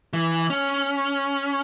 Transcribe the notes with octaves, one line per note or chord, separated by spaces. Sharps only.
E3
C#4